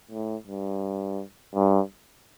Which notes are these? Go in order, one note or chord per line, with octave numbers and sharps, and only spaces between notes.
A2
G2
G2